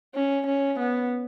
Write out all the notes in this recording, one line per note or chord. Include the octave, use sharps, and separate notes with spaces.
C#4
C#4
B3